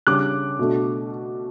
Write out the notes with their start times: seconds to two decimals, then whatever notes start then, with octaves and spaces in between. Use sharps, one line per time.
0.07 C#3 G3 D4 D6 F#6
0.59 B2 A3 D4